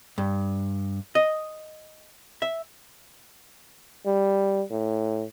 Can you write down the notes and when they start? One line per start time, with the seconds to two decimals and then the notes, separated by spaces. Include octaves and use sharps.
0.18 G2
1.15 D#5
2.42 E5
4.06 G3
4.70 A2